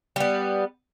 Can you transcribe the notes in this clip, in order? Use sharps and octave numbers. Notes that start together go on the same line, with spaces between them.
G3 B3